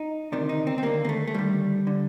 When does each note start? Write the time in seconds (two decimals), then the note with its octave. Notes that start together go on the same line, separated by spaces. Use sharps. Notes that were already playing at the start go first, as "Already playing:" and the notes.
Already playing: D#4
0.32 D2 C3 D#3 D4
0.49 D#4
0.67 C4
0.78 C4
0.83 D#2 D3 A#3
1.05 A#3
1.09 A3
1.27 A3
1.34 D#2 D3 G3
1.87 D3